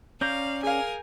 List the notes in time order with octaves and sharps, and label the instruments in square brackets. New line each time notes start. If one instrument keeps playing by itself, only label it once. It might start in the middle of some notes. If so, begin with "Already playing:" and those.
[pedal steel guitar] C#4 D5 A#5 [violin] F5 [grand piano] G6
[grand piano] G#4 F5 [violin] A#4 G#5